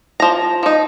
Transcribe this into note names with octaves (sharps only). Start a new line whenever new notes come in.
F3 A#5
F3 D#4